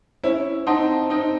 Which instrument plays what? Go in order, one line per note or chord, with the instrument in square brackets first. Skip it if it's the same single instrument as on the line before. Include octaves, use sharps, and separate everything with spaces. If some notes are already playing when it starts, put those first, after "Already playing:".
[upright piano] C#4 E4 [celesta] C5
[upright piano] C4 D#4 [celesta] F#5 A5 C6
[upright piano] C4 D#4 [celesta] C5